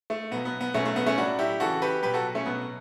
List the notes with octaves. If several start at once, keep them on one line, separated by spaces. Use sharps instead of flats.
A3
B2 F#3 B3
B3
B3
B2 F#3 A3 C#4
A3
B3
A3 C#4
A2 F#3 D4 F#4
E4 G4
C#3 E3 F#4 A4
G4 B4
B2 F#3 G4 B4
F#4 A4
A3 C#4
B2 F#3 B3